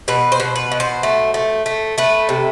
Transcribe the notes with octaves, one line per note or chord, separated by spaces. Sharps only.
B2 B4
C5
B2
B4
B2
C5
A3
A3
A3
A3 B4
C3